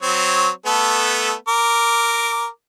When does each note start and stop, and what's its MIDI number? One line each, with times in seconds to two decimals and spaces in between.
0.02 0.49 54
0.02 0.49 60
0.02 0.49 73
0.66 1.34 57
0.66 1.34 59
0.66 1.34 69
1.48 2.47 70
1.48 2.47 86